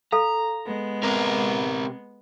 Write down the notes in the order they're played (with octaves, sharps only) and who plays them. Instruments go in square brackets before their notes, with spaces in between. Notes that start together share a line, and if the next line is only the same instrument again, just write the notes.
[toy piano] A4 F5 [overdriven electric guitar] A#5
[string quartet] G#3 B3
[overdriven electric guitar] C3 [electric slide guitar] C4 A#4